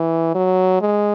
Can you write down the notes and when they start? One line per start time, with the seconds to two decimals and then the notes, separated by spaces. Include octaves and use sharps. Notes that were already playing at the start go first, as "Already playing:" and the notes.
Already playing: E3
0.35 F#3
0.81 G#3